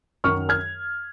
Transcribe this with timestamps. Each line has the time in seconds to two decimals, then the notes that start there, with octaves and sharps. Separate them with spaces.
0.24 F#2 D#3 F#3 C#6 F6
0.49 F6 G#6